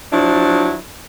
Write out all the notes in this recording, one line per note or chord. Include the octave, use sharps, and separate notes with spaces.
F3 F#3 D4 E4